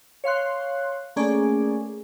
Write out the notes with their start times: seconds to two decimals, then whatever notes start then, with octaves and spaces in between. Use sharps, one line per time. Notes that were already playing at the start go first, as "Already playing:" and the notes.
0.24 C#5 F5 C6 F#6
1.16 A3 A#3 C#4 G#4 D5